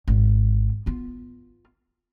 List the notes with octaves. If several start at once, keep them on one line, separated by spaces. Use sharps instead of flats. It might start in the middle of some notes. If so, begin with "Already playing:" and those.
G#1
B3 F4